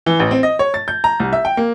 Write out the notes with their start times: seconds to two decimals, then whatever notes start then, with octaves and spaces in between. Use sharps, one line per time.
0.06 E3
0.20 A1
0.31 C4
0.43 D#5
0.59 C#5
0.74 A6
0.88 G6
1.04 A#5
1.20 C2
1.33 E5
1.45 G5
1.57 A#3